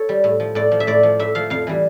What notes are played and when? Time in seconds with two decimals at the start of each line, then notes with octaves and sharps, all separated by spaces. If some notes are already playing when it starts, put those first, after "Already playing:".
Already playing: A4 C#5
0.09 G3
0.24 A2
0.40 F3
0.55 A2 D5
0.72 F3
0.80 E5
0.87 A2 D5
1.03 F3
1.19 A2 E5
1.35 F3 F5
1.50 F2 F5
1.67 E3 G3